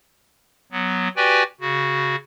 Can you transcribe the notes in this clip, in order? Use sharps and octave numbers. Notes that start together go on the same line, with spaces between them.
F#3 B3
F#4 G4 B4 D5 G5 G#5
C#3 F#4